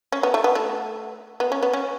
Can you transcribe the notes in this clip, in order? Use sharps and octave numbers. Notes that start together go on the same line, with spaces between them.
C#4
B3
A3
B3
A3
B3
C#4
B3
C#4